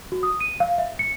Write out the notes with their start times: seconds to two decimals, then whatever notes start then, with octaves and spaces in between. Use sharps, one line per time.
0.12 F#4
0.23 D#6
0.40 D#7
0.60 F5
0.78 E5
0.99 C#7